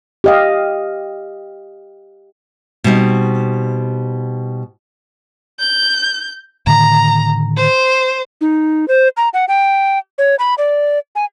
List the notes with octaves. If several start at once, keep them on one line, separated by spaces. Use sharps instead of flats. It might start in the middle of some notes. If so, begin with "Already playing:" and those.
G4 D#5 F5
B2 G3 C4 D#4
G6
A2 D3 D#3 A#5
C5
D#4
C5
A#5
F#5
G5
C#5
B5
D5
G#5